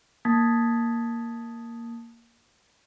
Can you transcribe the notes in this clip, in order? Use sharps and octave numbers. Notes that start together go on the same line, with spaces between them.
A#3 A5 D#6 G#6 A6 B6